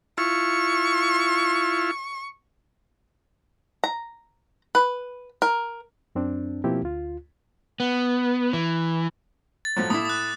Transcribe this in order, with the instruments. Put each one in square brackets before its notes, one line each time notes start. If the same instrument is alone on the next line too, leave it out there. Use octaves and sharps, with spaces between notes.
[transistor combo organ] E4 F4 [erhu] C#6
[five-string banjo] A#5
B4
A#4
[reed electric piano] F#2 C4 D4
B2 F3 A#3 C4 E4 G4
D2 F4
[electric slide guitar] B3
E3
[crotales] A6
[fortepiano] A2 F3 F#3
[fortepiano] A2 E4 [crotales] D6 D#6
[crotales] D#6 F#6